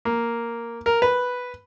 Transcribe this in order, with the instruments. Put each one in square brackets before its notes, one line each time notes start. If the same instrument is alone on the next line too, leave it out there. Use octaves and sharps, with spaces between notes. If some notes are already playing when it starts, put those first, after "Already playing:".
[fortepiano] A#3
A#4
B4